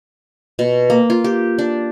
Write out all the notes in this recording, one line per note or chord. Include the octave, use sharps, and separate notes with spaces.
B2
A#3
F4
G4
D4